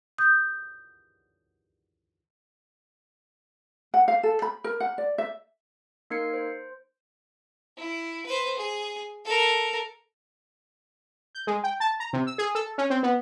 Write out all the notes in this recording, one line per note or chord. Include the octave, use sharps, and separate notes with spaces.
D#6 G6
F#5
F5
A4
B5
A#4
F#5
D5
E5
A#3 D#4 A#4 G#6 C7 C#7
C5
E4
B4 C5
G#4
A4 A#4
G6
G#3
G5
A5
A#5
C3
E6
G#4
A4
C#4
C4
B3